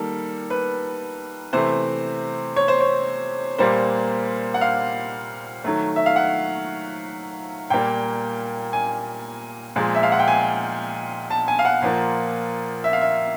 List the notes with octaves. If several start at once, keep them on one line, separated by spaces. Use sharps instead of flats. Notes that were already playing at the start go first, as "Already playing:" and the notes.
Already playing: D#3 G3 A#3 A4
B4
C3 E3 A3 C5
C#5
C5
C#5
A#2 G3 A#3 C5
F#5
F5
D#3 F#3 A3
E5
F5
F#5
A#2 G3 A#3 G5
G#5
A#2 F3 G#3
E5
F5
F#5
G5
G#5
A5
G#5
F5
F#5
A#2 F3 A#3
E5
F5
E5